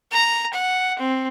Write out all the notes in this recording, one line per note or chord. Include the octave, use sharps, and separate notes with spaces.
A#5
F#5
C4